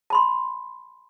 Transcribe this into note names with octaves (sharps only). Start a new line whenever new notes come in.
A5 B5 C6